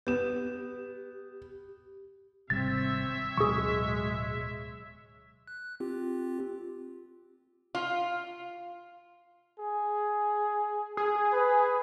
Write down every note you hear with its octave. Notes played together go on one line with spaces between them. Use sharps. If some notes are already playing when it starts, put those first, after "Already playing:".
B3 G4 E7
G#1 C3 G3 C4 C#5 E5 A6
D1 B2 F#3 G#3 G#4 C#6
F#6
C4 F4 G4
F4
G#4
G#4
B4